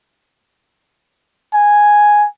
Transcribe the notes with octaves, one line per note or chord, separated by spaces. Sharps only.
G#5